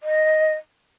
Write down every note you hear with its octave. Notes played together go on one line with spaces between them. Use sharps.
D#5